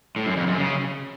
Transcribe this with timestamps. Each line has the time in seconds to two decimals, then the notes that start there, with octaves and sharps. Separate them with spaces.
0.16 A2
0.27 F#2
0.37 F2
0.47 F#2
0.57 C#3